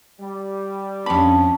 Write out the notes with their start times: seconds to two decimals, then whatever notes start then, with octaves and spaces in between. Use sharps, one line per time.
0.21 G3
1.06 F2 C#4 D4 A5 B5